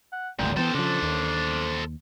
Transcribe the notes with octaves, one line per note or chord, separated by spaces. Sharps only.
F#5
G#1 D2 A#2 G#3 G5
E3 A3 B3 A4 C5 G5
C#3 F3 D4
D#2